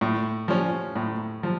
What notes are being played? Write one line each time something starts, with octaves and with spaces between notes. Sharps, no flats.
A2
F3 C#4
A2
F3